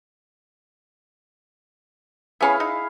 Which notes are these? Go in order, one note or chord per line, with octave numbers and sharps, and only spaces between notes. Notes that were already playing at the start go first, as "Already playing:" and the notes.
B3 C#4 E4 G#4 F5 B5
D#4